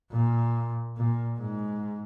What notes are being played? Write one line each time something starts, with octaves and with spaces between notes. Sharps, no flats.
A#2
A#2
G#2